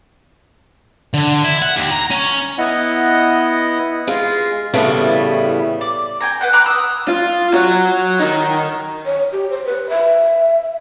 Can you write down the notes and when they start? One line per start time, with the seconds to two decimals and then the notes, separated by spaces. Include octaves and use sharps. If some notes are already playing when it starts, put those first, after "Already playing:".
1.14 D3
1.45 E4
1.62 F#5
1.76 D#2
1.91 A#5
2.10 C#4
2.58 B3 E4 D#5 F#5
4.07 G#3 F4
4.74 A2 C#3 E3 G3 A3 B3
5.81 D5
6.20 G5 G#5 A#5
6.41 B4 F#5 G5
6.53 A#5 B5 D6 F#6
6.66 D#6 E6
7.08 F4
7.54 F#4 C#5
8.20 D#3 D#4
9.06 C#5
9.32 G4
9.50 C5
9.66 B4
9.90 E5